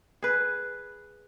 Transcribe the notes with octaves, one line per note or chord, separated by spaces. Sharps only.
G#4 B4